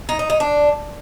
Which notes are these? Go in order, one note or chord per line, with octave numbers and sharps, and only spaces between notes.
D#4
D#4
D#4
D4